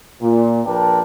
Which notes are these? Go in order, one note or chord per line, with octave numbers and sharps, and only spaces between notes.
A#2
A#1 A#4 B4 D5 G5 A5